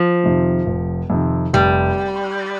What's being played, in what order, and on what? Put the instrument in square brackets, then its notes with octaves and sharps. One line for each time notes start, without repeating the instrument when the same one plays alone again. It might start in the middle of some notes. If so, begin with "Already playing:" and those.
Already playing: [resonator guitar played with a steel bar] F3
[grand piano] F2 C3 D#3
F1
F2 C3 D#3
[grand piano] F1 [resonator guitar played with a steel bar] G3